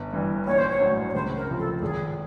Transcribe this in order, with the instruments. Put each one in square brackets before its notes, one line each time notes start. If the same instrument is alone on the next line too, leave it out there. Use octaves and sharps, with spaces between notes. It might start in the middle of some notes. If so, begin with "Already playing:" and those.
Already playing: [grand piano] G1
G2 E3
[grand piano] A#1 [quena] C#5
[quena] C5
C#5
[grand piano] A2 F#3
[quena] C#5
[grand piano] C#2 [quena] C5
[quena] A#4
[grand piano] C3 F3
[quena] A4
[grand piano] G#1 [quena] G#4